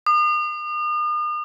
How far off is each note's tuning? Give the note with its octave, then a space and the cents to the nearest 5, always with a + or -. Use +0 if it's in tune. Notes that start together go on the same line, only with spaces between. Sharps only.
D#6 -40